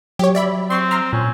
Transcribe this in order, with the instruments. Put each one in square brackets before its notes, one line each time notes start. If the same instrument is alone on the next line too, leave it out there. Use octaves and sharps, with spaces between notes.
[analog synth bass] F#3 [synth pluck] G4 C#5
[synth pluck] D5 E5 B5
[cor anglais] C4 [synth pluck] C6 C#6 C7
[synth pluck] A#5 C6 F6
[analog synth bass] A#2 [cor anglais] C#4